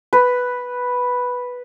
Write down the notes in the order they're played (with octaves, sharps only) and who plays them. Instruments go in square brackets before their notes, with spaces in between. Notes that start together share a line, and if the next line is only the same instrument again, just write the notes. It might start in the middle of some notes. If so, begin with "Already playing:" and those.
[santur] B4